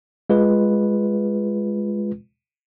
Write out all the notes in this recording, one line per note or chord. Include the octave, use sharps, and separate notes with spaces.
G#3 F4 B4